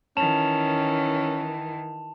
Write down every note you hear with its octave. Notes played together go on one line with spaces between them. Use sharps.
D#3 E3 C#4 A5 E7 F7